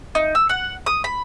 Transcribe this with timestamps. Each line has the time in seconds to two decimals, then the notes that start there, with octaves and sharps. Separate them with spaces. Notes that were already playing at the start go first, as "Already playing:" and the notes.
0.15 D#4
0.35 E6
0.49 F#5
0.86 D#6
1.04 B5